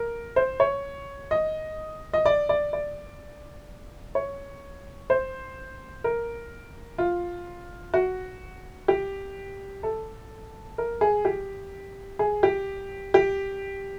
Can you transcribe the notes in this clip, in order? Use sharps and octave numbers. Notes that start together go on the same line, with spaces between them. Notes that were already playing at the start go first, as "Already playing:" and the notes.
Already playing: A#4
C5
C#5
D#5
D#5
D5
D5
D5
C#5
C5
A#4
F4
F#4
G4
A4
A#4
G#4
G4
G#4
G4
G4